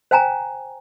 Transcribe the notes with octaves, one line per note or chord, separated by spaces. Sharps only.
C5 F5 G5 G#5 A#5